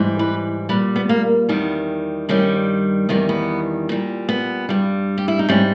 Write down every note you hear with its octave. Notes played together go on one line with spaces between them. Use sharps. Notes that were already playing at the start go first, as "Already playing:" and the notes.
Already playing: G#2 E3 G3
B4
A#2 G3 B4
B3
A#3
E2 D#3 G3 B3
G2 D#3 G3 C#4
E2 D#3 G3 B3
B3
A#2 G3
B3
G2 G3
G4
E4
D#4
G#2 G3 C#4